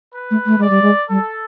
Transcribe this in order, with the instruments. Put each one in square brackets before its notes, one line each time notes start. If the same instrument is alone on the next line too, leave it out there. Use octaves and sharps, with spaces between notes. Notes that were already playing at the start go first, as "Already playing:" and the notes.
[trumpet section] B4
[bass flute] A3
A3
[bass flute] G#3 [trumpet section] D5
[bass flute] G3
G#3
[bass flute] G3 [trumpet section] A4